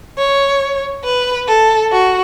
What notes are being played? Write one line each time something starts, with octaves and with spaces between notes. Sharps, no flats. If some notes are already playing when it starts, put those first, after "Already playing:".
C#5
B4
A4
F#4